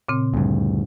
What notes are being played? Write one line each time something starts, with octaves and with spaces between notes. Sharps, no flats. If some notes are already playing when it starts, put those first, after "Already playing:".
A#2 C#3 C4
D2 G2